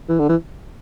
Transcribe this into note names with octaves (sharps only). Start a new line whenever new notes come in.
E3
D3
E3